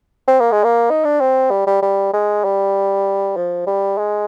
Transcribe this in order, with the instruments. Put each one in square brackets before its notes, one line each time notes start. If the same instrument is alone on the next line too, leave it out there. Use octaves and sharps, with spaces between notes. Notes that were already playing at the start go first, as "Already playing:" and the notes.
[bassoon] C4
A#3
G#3
A#3
D#4
D4
C4
G3
G3
G3
G#3
G3
F3
G3
G#3